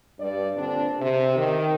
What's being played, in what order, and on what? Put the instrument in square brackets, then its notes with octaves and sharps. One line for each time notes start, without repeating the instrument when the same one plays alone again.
[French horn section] G2 D5
A#2 D3 C4 D4
C3
D#3